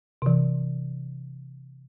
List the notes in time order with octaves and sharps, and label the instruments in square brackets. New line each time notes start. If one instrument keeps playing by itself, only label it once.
[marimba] C3 E3